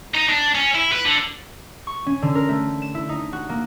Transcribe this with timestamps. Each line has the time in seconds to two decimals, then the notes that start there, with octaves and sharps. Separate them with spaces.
0.14 D#4
0.29 D4
0.55 C#4
0.75 E4
0.92 B4
1.05 D3
1.87 C#6
2.06 C#4
2.22 D3
2.35 A#4
2.49 A3
2.82 E7
2.95 E4
3.09 D#4
3.33 F#4
3.49 A#3